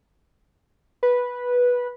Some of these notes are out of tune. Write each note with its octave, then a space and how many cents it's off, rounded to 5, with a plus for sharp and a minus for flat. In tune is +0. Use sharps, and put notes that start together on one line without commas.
B4 -10